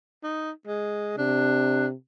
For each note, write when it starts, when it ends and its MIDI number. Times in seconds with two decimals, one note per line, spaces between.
0.24 0.51 63
0.67 1.16 56
1.18 1.94 48
1.18 1.87 62